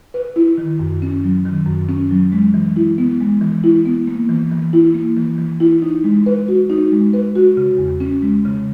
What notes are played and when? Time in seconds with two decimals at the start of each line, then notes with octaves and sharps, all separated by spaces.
0.14 B4
0.36 E4
0.58 D#3
0.80 F#2
1.02 C#4
1.24 F#3
1.45 D#3
1.67 F#2
1.89 C#4
2.11 F#3
2.32 G#3
2.54 E3
2.76 E4
2.98 B3
3.21 G#3
3.41 E3
3.64 E4
3.86 B3
4.07 A#3
4.29 E3
4.51 E3
4.73 E4
4.94 A#3
5.17 E3
5.38 E3
5.60 E4
5.82 D#4
6.04 G#3
6.26 B4
6.48 F#4
6.70 D#4
6.92 G#3
7.13 B4
7.35 F#4
7.57 C#3
7.78 E2
8.00 C#4
8.22 G#3
8.45 C#3